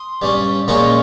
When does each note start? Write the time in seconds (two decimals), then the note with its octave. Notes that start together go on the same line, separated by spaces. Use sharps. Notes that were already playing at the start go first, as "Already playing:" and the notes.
Already playing: C6 D#6
0.22 G2 G3 C#4
0.68 A#2 F3 G#3 C#4 A#5 C#6